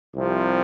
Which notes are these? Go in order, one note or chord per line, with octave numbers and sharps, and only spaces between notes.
C2 C3 F3